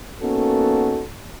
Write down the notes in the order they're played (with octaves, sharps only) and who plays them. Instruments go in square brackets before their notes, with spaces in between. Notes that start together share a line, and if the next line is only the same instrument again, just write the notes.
[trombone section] A#3 B3 C#4 D#4 F#4 A4